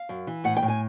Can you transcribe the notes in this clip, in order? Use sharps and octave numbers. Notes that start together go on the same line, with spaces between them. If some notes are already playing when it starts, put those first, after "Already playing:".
Already playing: F5
F#2
E3
A2 F#5
G5
A2
G#5